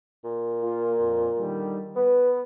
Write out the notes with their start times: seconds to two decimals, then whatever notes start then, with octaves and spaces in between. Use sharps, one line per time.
0.24 A#2
0.62 A#3 F4
1.00 F2
1.39 D3 D#3 G3
1.96 B3 B4